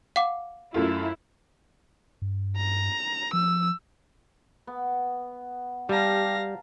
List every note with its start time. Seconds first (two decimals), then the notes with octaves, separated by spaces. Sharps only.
0.16 F5 F#5 D6
0.74 F#2 A3 E4 F4
2.22 G2
2.57 A#5
3.33 F3 E6
4.67 B3
5.89 G3 G4 F5 A5 A#5 A#6